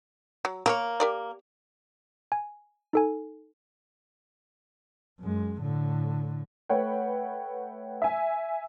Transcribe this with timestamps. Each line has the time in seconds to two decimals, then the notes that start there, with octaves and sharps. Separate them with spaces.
0.45 F#3
0.66 A#3 A#4 B4 C#5
1.00 G4 A#4 D5
2.32 G#5
2.93 D#4 A4 G#5
5.21 F#2 G#3
5.61 A2 D3
6.69 A3 B4 C#5 F#5 G5
8.02 E5 G#5